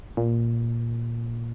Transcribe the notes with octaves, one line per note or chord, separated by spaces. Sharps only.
A#2